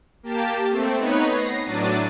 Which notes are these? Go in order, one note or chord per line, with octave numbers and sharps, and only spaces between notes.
A#3 G4 A5
A3 C4
B3 D#4 B4 C#5
A#6 C7
A2 F#3 D4 A6 D#7